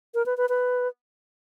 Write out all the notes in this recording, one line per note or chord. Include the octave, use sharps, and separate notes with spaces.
A#4
B4
B4
B4